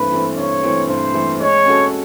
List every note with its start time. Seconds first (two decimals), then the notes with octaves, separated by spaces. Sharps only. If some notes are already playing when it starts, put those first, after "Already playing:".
Already playing: G2 E3 A3 C4 B4
0.12 E3 A3 C4
0.37 G2 C#5
0.63 E3 A3 C4
0.88 G2 C5
1.14 E3 A3 C4
1.40 G#3 C#5
1.66 C#4 F#4 A4